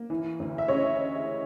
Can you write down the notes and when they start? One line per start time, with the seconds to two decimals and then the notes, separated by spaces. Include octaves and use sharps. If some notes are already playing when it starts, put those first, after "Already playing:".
Already playing: A#3
0.10 E3
0.40 D2
0.58 E5
0.68 C#3 C#5 D#5